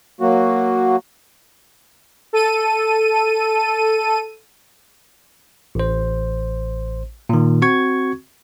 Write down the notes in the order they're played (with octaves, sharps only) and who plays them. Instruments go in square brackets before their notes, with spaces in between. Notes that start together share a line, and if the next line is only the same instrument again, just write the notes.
[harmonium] F#3 A#3 F#4
[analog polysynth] A4 D#7
[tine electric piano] A1 C5
A#2 D#3
C4 F#4 C#6 G#6